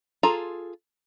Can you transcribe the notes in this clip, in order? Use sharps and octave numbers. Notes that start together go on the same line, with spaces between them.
F4 G#4 A4 A#5